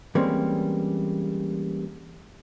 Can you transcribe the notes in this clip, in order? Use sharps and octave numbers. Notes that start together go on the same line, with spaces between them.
E3 G3 G#3 A#3 C4 C#4